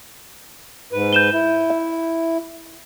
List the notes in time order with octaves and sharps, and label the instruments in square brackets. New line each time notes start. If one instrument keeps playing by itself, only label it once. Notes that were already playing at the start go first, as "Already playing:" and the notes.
[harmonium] G#2 B4
[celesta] G6 E7 G7
[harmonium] E4
[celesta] E5